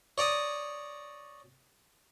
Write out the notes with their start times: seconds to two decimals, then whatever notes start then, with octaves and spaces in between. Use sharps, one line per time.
0.18 C#5 D5 A#5 D#6